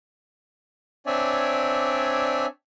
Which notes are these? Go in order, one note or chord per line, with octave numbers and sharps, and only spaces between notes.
C4 D4 C#5 D5 E5 G#5